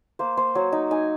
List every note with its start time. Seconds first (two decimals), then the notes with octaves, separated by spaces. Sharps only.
0.19 A#3 C5
0.37 A#3 C5
0.55 F#3 C#5
0.72 D#4
0.91 D#4 G#5